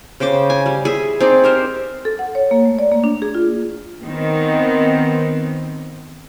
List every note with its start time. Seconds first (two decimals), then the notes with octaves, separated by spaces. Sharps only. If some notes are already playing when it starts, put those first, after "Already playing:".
0.20 C#3 C5 G5 D6
0.50 G#5
0.66 G3
0.85 G#4 E5
1.20 C4 D#4 D5
1.44 G4 A#4 C5
2.05 A4
2.19 F#5
2.35 C#5
2.51 A#3
2.66 A3
2.79 D5
2.91 A#3
3.04 D4
3.22 G#4
3.34 F4
4.06 D#3 B3 C4